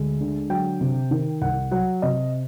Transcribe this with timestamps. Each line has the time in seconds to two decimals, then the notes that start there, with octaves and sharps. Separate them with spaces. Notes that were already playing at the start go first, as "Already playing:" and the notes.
Already playing: D2 G#3
0.20 D3
0.50 F#3 G5
0.81 C3
1.11 D#3
1.41 C2 F#5
1.72 F#3 F#5
2.02 C3 D#5